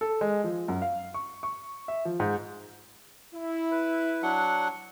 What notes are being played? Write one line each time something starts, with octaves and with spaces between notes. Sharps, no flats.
A4
G#3
F3
F#2
F5
C#6
C#6
E5
F3
G#2
E4
B4
F#3 D4 F#5